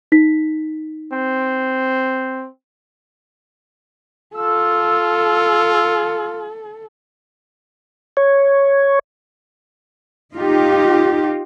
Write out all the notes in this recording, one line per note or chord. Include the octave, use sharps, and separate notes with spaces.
D#4 B6
C4
F4 A4 E6
C#5
D#4 F4 G4